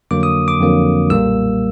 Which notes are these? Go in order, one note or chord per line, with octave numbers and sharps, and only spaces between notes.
F2 D3 F#3 A#3 D6
D#6
D6
F2 D3 F#3 A#3
B1 A#2 G3 A#3 E6